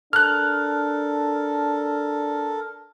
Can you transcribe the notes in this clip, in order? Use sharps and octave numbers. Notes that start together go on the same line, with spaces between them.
D4 A4 A#4 F6 F#6